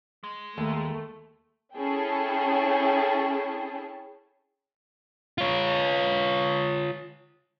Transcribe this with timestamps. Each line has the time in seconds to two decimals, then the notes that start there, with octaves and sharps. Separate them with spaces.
0.24 G#3
0.58 D#2 A3
1.76 C#4 E4 G#4 A4 G5 A5
5.38 F4 C#5